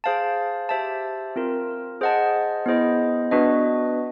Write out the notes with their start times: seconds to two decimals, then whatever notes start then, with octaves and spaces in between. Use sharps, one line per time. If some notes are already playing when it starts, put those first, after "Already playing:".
0.04 G#4 C5 F5 A5
0.69 G4 C5 E5 A5
1.36 C4 F4 A#4
2.01 G#4 C5 D#5 F#5 A5
2.66 B3 E4 G#4 C5 D#5
3.31 B3 D4 F#4 B4 D#5